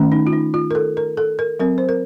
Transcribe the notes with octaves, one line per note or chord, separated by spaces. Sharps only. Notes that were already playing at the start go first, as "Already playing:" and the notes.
Already playing: D#3 A3 C#4
D#4
F4
D#4
F4
A#4
A4
A#4
A4
A#4
F#3 C4 A#4
C5
A#4